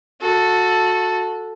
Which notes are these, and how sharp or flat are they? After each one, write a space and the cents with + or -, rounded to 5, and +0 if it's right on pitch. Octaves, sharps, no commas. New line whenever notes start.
F#4 -20 A4 +0